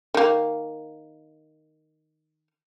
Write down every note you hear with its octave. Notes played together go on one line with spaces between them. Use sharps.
D#3 A#3